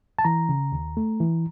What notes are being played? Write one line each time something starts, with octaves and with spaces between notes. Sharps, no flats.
A5
E3 A#5
C#3
D#2
A3
E3